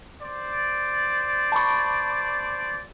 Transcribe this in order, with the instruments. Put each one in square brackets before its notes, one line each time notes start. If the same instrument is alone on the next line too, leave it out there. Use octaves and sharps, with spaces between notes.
[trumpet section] C5 D5
[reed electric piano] A5 B5 C#6